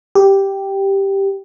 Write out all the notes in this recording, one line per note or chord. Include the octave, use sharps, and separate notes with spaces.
G4